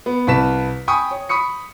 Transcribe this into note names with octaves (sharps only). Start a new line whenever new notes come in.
B3
C2 B4 A5 B6 E7
G5 G#5 B5 C#6 D#6
C#5
B5 C#6 D#6 C#7